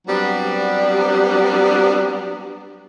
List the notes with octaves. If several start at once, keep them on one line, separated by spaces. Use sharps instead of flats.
F#3 G3 B3 C4 D4